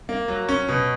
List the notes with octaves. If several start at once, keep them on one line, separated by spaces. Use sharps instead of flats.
A#3
F#3
C#4
B2